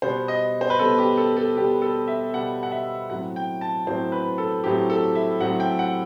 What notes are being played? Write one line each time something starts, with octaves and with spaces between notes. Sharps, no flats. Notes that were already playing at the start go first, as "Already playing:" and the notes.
B2 G3 B3 C5
D#5
C5
B4
B2 G3 B3 A4
G4
A4
A4
B2 G3 B3 G4
A4
E5
B2 G3 B3 F#5
F#5
E5
A2 F#3 C4 F#5
G5
A5
A2 F#3 C4 C5
B4
A4
A2 F#3 C4 G4
A4
E5
A2 F#3 C4 F#5
G5
F#5